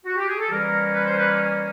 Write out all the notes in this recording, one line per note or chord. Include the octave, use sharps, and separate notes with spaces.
F#4
G4
G#4
A4
E3 G3 A#3 C#4 A#4
B4
C5
B4